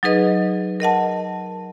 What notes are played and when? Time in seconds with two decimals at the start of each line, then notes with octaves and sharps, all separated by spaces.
0.03 F#3 D#4 G#4 B4 D#5
0.80 A#4 D#5 F#5 A5